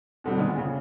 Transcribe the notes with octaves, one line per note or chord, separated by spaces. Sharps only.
B2 D3 G3 C4
A#2 D#3 G#3 B3
A#1 C#3